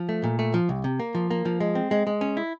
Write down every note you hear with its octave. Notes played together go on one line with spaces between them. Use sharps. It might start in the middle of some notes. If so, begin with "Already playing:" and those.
Already playing: F3
A3
A#2
A3
F3
C2
C3
A#3
F3
A#3
F3
G#3
C4
G#3
G#3
C#4
E4